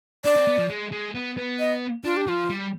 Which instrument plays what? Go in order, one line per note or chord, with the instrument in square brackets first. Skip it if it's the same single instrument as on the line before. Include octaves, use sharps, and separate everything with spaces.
[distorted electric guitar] D4 [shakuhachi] D5
[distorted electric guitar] C4
B3
F3
G#3
G#3
B3
B3
[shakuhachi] D#5
[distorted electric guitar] D4 [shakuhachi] F4
[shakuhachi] G4
[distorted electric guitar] F3 [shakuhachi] F4
[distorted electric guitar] G3